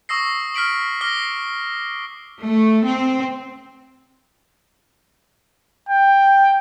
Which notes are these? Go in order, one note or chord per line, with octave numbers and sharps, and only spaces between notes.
C#6 D#6 E6 A#6 C7
F6 B6 D7 F#7
D6 F6 A#6 C7 G7
A3
C4
G5